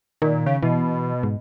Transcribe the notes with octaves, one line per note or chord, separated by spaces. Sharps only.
A#2 D#3
C#3
B2 E3
G#2